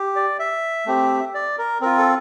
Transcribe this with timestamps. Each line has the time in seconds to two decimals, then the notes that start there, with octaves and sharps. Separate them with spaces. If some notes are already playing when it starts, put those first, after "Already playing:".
Already playing: G4
0.16 D5
0.39 E5
0.86 A3 C4 G4
1.34 D5
1.59 A#4
1.81 C4 F4 A#4
1.98 A4